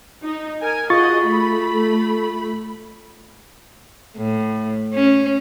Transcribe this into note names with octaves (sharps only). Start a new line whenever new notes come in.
D#4
A#4 G#5
F4 F#4 G#4 D#5 C#6 A6
A3 B5
A2
C#4